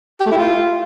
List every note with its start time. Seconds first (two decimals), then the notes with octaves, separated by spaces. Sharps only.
0.20 G4
0.26 A3
0.32 E4
0.37 F4